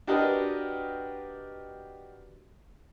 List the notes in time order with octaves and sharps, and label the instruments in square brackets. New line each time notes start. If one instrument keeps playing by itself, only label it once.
[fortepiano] D4 F#4 G4 A#4 B4 D#5